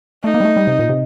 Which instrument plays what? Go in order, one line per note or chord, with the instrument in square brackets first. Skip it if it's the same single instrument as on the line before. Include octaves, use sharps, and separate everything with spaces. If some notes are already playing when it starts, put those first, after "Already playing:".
[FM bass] A3 [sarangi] D#4
[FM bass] A#3
G3
A3
G3
C3
A#2
C3